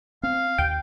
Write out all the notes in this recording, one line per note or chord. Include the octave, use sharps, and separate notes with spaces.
C4 F5
D#2 G5